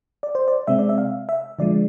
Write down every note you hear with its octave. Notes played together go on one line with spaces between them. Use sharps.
D5
C5
D5
C3 G#3 C4 E5
D5
E5
F5
E5
D3 F3 G#3 D5